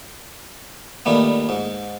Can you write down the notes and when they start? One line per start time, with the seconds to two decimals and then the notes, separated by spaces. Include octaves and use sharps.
1.06 A#2 D#3 G3 A3 B3
1.49 G#2